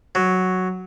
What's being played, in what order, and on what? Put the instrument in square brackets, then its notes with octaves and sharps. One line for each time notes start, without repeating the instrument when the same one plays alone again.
[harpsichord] F#3